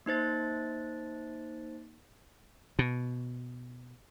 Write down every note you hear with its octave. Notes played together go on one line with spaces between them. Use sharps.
A#3 D#4 C5 A6
B2